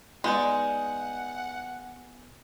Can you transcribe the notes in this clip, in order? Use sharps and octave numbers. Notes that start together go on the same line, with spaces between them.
G#3 B3 D#4 D5 F#5 G#5 G6